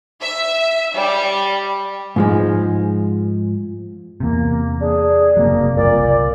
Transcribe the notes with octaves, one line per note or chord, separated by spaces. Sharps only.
E5
G3
G#2 F3 G#3
E2 C3 A#3
D4 G#4
F#1 C3 F#3 A#3
F#1 C2 A#2 D5